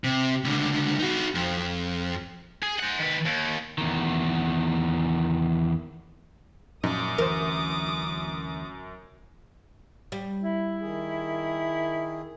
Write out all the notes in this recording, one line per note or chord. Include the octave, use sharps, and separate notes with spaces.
C3
C#2 D3
D#4 F#4
F2
G#4
C5 F#5
D#3 B4
D#2
E2 D#3
F#2 A#2 F3 D#4 D6 D#6
D2 E3 A#4 C5
G3
E4
D#3 G#4